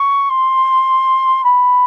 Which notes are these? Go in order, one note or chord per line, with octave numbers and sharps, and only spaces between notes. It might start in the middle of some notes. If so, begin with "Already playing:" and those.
Already playing: C#6
C6
B5